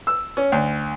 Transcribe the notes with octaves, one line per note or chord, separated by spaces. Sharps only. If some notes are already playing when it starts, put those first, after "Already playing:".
E6
C#4
D2